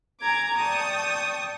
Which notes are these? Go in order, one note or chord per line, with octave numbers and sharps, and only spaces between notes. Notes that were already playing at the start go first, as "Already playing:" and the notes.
G#5 A#5 D6 G#6
D5 G5 A5 C#6 D#6